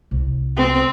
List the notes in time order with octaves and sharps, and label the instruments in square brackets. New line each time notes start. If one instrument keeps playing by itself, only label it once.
[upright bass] C2
[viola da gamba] C4